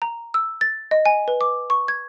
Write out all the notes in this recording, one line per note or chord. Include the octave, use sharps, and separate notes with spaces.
A#5
E6
A6
D#5
G#5
B4
D6
C#6
G#6